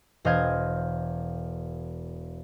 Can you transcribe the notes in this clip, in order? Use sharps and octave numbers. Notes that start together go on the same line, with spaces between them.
E1 C5 D#5 F5 G6 G#6